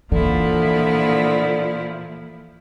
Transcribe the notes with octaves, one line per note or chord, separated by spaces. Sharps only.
A#2 D3 E3 F3 E4